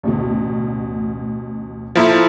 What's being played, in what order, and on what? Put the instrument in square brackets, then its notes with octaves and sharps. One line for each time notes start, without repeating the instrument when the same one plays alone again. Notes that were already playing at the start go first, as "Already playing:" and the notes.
[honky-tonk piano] A1 D2 B2
[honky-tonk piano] A#2 A#5 [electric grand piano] F3 E4 A4